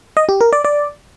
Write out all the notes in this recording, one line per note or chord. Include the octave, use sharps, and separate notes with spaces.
D#5
G4
A#4
D5
D5